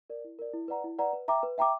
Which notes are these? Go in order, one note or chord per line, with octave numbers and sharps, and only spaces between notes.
A#4 D5
E4
A#4 D5
E4
B4 D5 F#5 A#5
E4
B4 D5 F#5 A#5
B4
E5 G5 A#5 D6
B4
E5 G5 A#5 D6